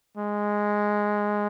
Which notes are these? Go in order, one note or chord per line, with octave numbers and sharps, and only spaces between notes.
G#3